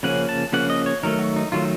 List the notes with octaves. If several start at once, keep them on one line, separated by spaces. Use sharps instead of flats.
C#3 F3 A#3 C#4 F#5
A5
C#3 F3 A#3 C#4 F#5
D#5
C#5
D#3 F#3 A3 A#4
F#4
D#4
D#3 F#3 A3 F4